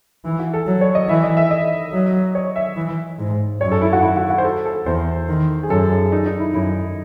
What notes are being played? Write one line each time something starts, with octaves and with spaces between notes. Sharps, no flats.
E3 E4
F#4
A4
F#3
C#5
D#5
E3 E5
D#5
E5
D#5
F#3
C#5
E5
E3
G#2
F#2 C#5
A4
E4
F#4
E4
F#4
F#4
C5
A4
A4
E2 C5
D#3
G#4
F#2 A4
G#4
D#4
D#4
E4
F#2 E4